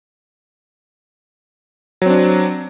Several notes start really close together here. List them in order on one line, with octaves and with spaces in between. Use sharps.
F#3 C4 D4